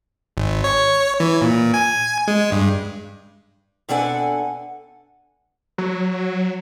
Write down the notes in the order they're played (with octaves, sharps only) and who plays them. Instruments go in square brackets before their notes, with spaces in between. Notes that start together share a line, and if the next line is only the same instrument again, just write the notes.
[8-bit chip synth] G#1
C#5
E3
A#2
G#5
G#3
G2
[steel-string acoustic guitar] B2 C4 D4 A4 F#5 G#5
[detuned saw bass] F#3